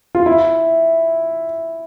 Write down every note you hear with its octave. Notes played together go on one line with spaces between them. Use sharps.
F4
E4